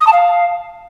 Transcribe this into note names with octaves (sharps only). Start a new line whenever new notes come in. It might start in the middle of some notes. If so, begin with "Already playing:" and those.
D#6
A5
F5